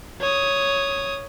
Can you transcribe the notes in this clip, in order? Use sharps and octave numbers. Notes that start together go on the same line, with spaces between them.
C#5 D#6